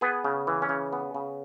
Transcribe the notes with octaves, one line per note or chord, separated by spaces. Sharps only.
B3 G#4 B4
C#3
E3
C#4
C#3
B3
C#3